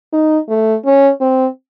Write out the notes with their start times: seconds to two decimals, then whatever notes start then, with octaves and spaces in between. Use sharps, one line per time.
0.13 D#4
0.49 A3
0.85 C#4
1.21 C4